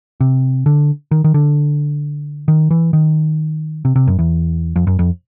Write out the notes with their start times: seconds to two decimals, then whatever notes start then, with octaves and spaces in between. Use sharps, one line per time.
0.20 C3
0.66 D3
1.11 D#3
1.24 D#3
1.34 D3
2.48 D#3
2.71 E3
2.93 D#3
3.85 C3
3.96 C3
4.07 F#2
4.19 E2
4.76 F2
4.87 F#2
4.99 F2